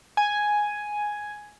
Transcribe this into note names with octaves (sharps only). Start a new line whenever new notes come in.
G#5